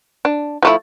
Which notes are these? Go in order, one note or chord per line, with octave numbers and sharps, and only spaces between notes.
D4
F3 A3 E4